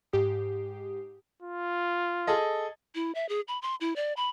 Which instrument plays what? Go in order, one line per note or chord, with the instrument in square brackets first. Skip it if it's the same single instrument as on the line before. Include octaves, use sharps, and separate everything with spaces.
[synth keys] G#2 G4 D#6 C7
[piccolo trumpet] F4
[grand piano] G#4 A4 D#5
[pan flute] E4
E5
G#4
B5
C6
E4
D5
B5